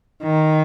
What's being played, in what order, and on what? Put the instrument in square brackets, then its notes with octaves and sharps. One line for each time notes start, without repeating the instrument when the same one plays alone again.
[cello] D#3